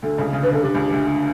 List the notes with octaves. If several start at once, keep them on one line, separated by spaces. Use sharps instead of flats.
D2 D3 A4
C#2 C#3
C#3
D3 B4
C#3 A4
D3 G4
C#2 C#3
D2 D3